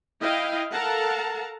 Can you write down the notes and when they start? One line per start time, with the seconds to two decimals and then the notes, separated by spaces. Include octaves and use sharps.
0.20 E4 D#5 F5 G5
0.71 A4 A#4 F5 F#5 A5 A#5